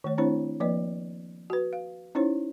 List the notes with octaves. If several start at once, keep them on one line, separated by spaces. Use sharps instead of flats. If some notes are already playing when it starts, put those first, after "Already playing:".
D#3 A3 C#5
A3 C4 D4 E4 C5 C#5
F3 A#3 B4 D5 D#5
F#4 B4
F5
C#4 D#4 E4 C5 C#5